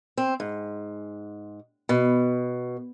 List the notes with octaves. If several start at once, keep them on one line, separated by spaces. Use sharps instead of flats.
C4
G#2
B2